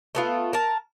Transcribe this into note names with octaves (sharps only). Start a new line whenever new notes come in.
A3 B3 F4
A#4 A5